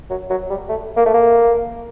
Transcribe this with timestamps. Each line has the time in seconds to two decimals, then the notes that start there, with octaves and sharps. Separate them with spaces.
0.10 F#3
0.30 F#3
0.50 G3
0.69 A3
0.97 A#3
1.06 A3
1.14 A#3